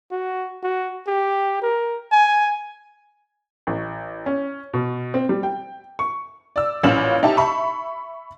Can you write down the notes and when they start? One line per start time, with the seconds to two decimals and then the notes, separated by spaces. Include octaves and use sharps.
0.11 F#4
0.63 F#4
1.07 G4
1.62 A#4
2.11 G#5
3.67 A1
4.26 C#4
4.74 B2
5.14 C4
5.29 G3
5.43 G5
5.99 C#6
6.56 D5 E6
6.83 A1 A#2 C#4 F5 E7 F#7
7.23 D#4 G4 E5 A5
7.37 E5 B5 C#6